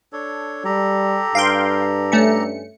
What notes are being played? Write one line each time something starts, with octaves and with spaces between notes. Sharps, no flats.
D4 A4 C#5
G3 G4 A4 A#5
G2 F5 G5 C6
A3 C#4 C#7